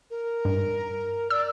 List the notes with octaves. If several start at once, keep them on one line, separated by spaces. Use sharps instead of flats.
A#4
G2
D5 E6